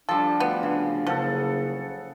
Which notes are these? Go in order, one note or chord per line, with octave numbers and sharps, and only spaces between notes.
F3 G3 D4 A4
D2 B3
C#3
F#1 C#3 F3 A4 F#5